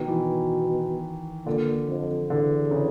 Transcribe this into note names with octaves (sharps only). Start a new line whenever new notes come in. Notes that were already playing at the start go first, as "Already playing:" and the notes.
Already playing: B2 D#3
E3
A#2 D3
F2
E2 D3
C#3